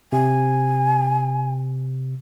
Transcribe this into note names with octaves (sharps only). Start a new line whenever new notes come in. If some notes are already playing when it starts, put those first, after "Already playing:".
C3 G#5